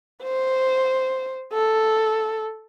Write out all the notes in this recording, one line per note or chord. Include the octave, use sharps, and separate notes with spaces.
C5
A4